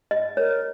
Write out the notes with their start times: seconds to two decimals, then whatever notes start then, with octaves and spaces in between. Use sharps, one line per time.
0.11 D#5
0.37 A#4 C#5